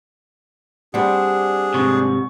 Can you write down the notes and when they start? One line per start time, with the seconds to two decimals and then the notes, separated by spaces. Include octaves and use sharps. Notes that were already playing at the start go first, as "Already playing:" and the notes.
0.94 G3 C4 D4 G#4 F#5
1.74 G#2 C3 C#6